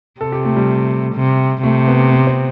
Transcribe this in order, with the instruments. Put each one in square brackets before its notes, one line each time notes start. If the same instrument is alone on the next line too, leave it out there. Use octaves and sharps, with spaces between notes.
[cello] C3 [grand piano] A4
[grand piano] G4
A3
G3
[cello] C3
[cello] C3 [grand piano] A3
[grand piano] B3
B3
C4